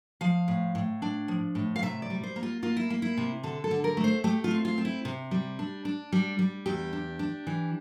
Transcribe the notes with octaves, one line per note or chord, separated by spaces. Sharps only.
F3 F5
A2
A2
D4
F3
A2
F5
C3 E5
D5
G3
C5
A#3
F4
A#3 F4
E4
A#3
E4
C3
D3 A4
A4
D3
A#4
A3
C5
A3 G4
F4
C4
F4
C4
E4
C3
G3
D4
D4
G3
G3
E2 G4
D4
D4
E3